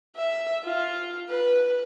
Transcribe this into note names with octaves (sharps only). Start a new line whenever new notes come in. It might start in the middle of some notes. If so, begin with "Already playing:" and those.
E5
F4
B4